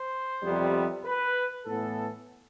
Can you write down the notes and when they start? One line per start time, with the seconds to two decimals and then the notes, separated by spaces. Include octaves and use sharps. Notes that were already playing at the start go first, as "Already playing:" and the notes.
Already playing: C5
0.42 F2 C3 G3 B3
1.05 B4
1.66 A2 E3 B3 A4